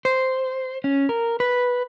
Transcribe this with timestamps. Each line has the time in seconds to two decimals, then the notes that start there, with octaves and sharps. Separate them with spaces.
0.05 C5
0.84 C#4
1.09 A#4
1.40 B4